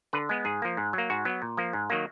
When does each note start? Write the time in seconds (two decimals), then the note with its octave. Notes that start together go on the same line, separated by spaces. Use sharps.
0.13 D3 B4
0.29 G#3 B3
0.45 G#2 G#4
0.62 F3 A#3
0.77 G#2
0.93 F#3 A#3
1.10 G#2 F#4
1.25 F#3 B3
1.42 A#2
1.57 F3 A#3
1.73 G#2
1.90 D#3 F#3 A#3